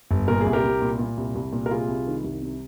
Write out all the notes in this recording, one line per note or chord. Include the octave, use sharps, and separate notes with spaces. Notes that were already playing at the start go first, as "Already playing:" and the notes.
G1
A#2 A#4
G#4
C2
G4 A#4
C2
A#2
A#2
C2
C2
A#2
A#4
C3 F4 G#4
C2
D#3
C2
C3